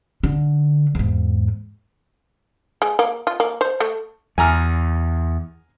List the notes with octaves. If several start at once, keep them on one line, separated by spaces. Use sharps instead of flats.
D3
E2 G#2
G#3
A#3
F4
A#3
C5
A3
E2 G#5 A#5 F6